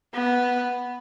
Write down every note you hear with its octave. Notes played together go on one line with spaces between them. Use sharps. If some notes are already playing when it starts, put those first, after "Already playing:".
B3